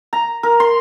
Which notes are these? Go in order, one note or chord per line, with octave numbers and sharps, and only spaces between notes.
A#5
A#4
C6